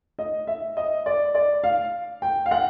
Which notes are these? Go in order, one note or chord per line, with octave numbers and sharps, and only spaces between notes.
D#5
E5
D#5
D5
D5
F5
G5
F5
F#5